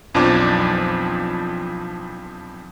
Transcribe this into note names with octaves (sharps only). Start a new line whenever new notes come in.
B1 F2 F3 D4 D6